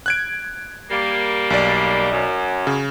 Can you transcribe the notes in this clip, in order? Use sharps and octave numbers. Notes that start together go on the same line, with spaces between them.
F#6 G#6 D7
G3 A#3
B1 D5
F#2
C#3